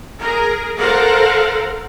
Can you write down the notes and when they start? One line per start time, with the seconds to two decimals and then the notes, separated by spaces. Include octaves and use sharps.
0.20 G#4 A#4
0.80 A4 A#4 C5 F5 F#5